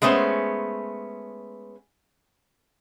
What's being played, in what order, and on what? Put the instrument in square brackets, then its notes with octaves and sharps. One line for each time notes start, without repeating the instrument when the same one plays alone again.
[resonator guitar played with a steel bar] G#3 A3 B3 C#4 C5